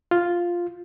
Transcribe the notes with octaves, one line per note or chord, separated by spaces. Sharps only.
F4